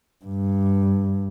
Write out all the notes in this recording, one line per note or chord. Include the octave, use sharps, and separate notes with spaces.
G2